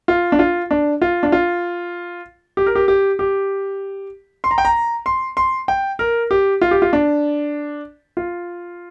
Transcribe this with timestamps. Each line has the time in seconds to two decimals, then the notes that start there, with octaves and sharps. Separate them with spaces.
0.08 F4
0.32 D4
0.39 F4
0.71 D4
1.02 F4
1.23 D4
1.32 F4
2.57 G4
2.66 A#4
2.75 G4
2.88 G4
3.19 G4
4.44 C6
4.51 A#5
4.58 G5
4.65 A#5
5.06 C6
5.37 C6
5.68 G5
5.99 A#4
6.31 G4
6.61 F4
6.71 G4
6.82 F4
6.93 D4
8.17 F4